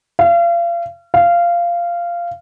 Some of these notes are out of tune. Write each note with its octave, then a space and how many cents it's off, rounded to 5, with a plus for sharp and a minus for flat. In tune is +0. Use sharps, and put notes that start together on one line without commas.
F5 -35
F5 -15